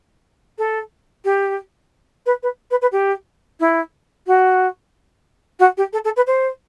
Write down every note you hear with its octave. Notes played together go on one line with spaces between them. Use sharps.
A4
G4
B4
B4
B4
B4
G4
E4
F#4
F#4
G4
A4
A4
B4
C5